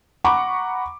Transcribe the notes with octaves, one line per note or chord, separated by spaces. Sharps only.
F#5 A#5 B5 C#6 D6